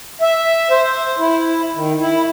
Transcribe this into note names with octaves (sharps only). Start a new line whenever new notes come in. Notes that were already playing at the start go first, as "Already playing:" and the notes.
E5
C5
E4
D#3
E4